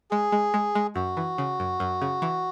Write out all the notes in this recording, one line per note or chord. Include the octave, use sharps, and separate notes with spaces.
G#3 G#4
G#3
G#3
G#3
F#2 F#4
E3
C#3
F#2
F#2
C#3
E3